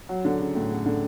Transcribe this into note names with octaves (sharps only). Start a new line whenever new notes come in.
F#3
D3
C#3
A2
C#3
D3